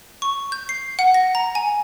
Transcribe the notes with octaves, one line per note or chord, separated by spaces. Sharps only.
C#6
G6
C7
F#5
A#6
A#5
G#5